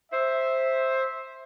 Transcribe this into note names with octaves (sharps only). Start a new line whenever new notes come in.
C5 E5